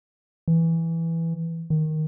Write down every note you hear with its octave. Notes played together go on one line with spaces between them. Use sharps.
E3
D#3